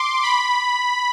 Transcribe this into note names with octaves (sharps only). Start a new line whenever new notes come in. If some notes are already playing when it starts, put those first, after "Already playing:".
Already playing: C6 D6
B5